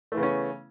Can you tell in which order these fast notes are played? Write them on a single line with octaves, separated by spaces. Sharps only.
A3 E3 C#3 B3 C#4